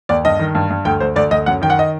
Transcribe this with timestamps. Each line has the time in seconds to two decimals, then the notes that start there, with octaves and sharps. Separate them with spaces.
0.09 D#2 D5
0.25 G2 D#5
0.39 D#3
0.55 G2
0.70 G2
0.85 D2 G5
1.00 D2 C5
1.16 D2 D5
1.31 D2 D#5
1.46 F#2 F#5
1.61 D#3 G5
1.70 F#5
1.79 D#5